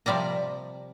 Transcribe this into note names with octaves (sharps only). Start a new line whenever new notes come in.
C3 F3 G3 D5 A#5